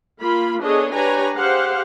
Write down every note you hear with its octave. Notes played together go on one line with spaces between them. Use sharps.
A#3 F4 B5
B3 D4 G#4 A4 C#5 D#5
D4 G4 B4 C#5 G#5 A#5
G4 G#4 C5 F5 F#5